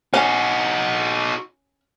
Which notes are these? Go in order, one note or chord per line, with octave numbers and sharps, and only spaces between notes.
C#4 D#4 F#4